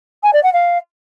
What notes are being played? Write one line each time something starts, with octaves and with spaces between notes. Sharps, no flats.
G#5
D5
F#5
F5